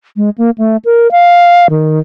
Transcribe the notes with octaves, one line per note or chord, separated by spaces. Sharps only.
G#3
A#3
A3
A#4
F5
D#3